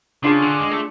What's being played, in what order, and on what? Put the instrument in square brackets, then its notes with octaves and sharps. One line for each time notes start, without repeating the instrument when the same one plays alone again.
[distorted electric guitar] C#3 [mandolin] D4 F4 G#4
[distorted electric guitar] D3
G#3
A3